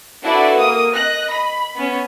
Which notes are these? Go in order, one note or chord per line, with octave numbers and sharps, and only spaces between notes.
D4 E4 F#4 A4 B4 D5
A#3 D#6
D#5 F#6 A#6
B5
B3 C#4 C#5